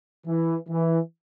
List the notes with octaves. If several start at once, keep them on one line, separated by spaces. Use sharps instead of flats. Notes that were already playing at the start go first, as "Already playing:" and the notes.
E3
E3